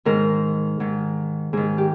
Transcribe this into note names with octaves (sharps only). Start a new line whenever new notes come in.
G#2 D#3 A#4
G#2 D#3
G#2 D#3 G#4
G4